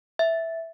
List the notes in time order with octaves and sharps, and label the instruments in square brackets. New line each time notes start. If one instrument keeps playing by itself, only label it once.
[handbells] E5